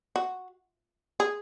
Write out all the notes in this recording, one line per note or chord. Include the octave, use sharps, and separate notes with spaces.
F#4
G#4